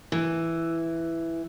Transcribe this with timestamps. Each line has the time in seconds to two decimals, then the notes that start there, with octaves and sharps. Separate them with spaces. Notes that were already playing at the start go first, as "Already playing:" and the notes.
0.12 E3